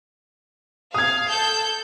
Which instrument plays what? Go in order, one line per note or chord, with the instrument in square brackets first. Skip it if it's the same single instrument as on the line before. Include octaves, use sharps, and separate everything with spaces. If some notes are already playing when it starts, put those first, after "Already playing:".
[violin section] F5 [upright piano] D#6 G#6
[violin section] A4 G6